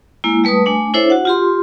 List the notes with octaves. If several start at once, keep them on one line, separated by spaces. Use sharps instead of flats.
G#3 A#3 E4
G3 A3 B4 A5 D#6
A3 D4 G#5
D4 E4 A4 C5 C#5 E5
F#4 F#5
F4 G4 C6